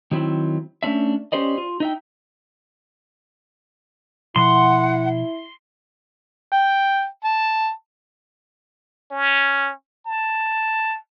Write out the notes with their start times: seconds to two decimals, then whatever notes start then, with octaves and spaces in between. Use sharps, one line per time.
0.11 D#3 F#3 C4 E4
0.83 A3 C#4 D4 E5
1.32 C#4 G4 C5 D5 D#5
1.58 F4
1.80 D#4 E5 G5
4.36 B2 F3 E4 F#5 C6
6.52 G5
7.24 A5
9.11 C#4
10.06 A5